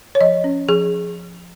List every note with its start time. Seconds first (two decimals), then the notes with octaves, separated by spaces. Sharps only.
0.15 C#5
0.20 F3 D#5
0.44 C#4
0.69 F3 G#4